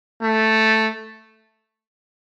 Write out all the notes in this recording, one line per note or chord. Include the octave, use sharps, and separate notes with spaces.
A3